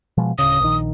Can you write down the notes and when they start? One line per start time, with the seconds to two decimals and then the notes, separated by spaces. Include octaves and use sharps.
0.17 B2 F3 G#3
0.39 D1 C#3 D#6
0.60 A#1 D#3